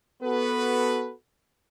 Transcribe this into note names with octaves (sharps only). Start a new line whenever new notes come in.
B3 F#4 A4 B4